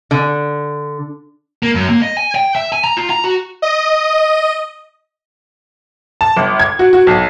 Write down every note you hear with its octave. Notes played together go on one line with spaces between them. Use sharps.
D3
A#3
F#2
A#3
D#5
G#5
G5
E5
G#5
A#5
F4
A#5
F#4
D#5
A5
G1
G#6
F#4
F#4
B1